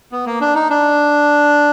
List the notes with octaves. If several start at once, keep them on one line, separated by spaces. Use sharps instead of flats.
B3
A#3
D4
D#4
D4